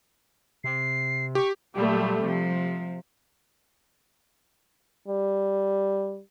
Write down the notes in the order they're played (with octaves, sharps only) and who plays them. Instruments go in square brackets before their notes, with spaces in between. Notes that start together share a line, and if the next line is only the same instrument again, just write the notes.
[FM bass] C3 [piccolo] C7
[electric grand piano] G4 [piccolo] C#6
[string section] A#2 F#3 G3 A3
C3 F3
[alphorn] G3